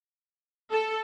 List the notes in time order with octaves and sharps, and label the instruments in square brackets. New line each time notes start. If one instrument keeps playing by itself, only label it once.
[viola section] A4